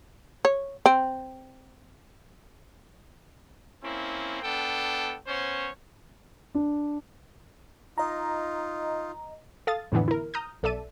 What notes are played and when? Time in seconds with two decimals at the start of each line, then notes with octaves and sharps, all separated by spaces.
0.45 C#5
0.86 C4
3.83 A#3 C4 C#4 E4
4.43 B3 D4 A4 G5
5.27 B3 C#4 C5 C#5
6.55 D4
7.98 D#4 F4 D#5 A#5
9.67 A4 F5 D#6 A6
9.92 F2 A2 D3 E3 B3
10.08 E4 A#4
10.34 A#5 D#6 F6 G6
10.63 B1 A4 D5 E5 A5 D#7